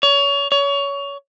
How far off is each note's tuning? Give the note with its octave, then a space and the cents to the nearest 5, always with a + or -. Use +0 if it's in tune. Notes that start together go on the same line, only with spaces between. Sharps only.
C#5 +25
C#5 +25